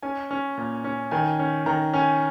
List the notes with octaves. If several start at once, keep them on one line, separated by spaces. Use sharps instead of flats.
C#4 G#5
C#4
A#2
C#4
D#3 G#5
C#4
D#3 A#5
C#4 G#5